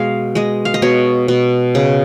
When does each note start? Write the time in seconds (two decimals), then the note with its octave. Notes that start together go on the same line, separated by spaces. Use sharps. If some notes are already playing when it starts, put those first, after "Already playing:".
Already playing: B2 G#3 F5
0.35 G#3 D#5
0.65 F5
0.74 D#5
0.82 B2 C#5
1.28 B2
1.75 C#3